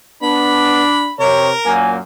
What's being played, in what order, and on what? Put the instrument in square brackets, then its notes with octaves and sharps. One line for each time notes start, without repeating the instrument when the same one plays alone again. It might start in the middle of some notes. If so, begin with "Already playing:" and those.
[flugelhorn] B3 [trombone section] D4 [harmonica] B5
[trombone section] C3 [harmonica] A#4 [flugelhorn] C#5
[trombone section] F#2 A#2 A#3 [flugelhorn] G#5